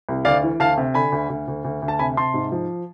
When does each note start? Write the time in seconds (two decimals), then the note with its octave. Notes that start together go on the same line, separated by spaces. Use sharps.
0.09 C2
0.25 D2 D5 F5
0.43 E3
0.60 D2 F5 A5
0.78 C3
0.94 D3 G#5 B5
1.12 D2
1.30 D2
1.48 D2
1.65 D2
1.82 D2
1.88 A5
1.99 C3 G#5 B5
2.17 C3 A5 C6
2.34 G#2
2.52 F3